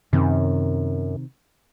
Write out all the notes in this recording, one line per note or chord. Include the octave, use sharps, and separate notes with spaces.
F#2 C3 D#3 C4